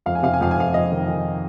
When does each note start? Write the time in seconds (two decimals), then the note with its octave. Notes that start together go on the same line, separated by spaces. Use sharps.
0.06 F2 F5
0.15 G#5
0.23 C3 F5
0.34 G#5
0.40 F2 F5
0.51 G#5
0.57 F2 F5
0.74 F2 D#5
0.92 D#3
1.08 D#3